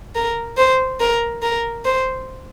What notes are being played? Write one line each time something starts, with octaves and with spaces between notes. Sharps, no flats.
A#4
C5
A#4
A#4
C5